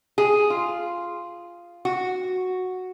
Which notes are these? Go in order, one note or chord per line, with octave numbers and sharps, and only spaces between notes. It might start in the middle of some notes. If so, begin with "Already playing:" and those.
G#4
F4
F#4